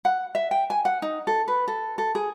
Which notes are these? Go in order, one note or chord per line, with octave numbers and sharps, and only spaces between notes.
F#5
E5
G5
G#5
F#5
D#4
A4
B4
A4
A4
G#4